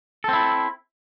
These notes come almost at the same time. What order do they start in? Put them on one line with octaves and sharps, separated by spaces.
A4 C4 E4